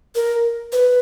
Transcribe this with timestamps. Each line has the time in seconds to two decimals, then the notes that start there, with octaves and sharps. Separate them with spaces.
0.15 A#4
0.73 B4